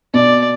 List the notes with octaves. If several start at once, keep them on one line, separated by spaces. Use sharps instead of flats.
B2 D5